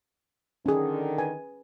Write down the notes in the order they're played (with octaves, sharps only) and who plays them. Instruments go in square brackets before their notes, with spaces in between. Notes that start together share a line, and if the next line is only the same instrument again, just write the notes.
[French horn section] D3 D#3 [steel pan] C#4 G#4
[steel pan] B4 G#5